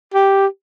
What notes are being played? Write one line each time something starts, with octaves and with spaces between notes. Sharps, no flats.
G4